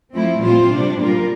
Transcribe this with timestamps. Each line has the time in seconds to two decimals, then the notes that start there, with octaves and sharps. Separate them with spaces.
0.15 F3 A3 C4 E4
0.43 A#2 G3 C4 F4 C5
0.71 C3 G3 D4
0.99 A#2 G3 A#3 F4 A#4